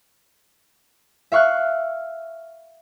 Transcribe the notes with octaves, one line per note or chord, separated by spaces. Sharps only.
E5 F5 C#6 F6 F#6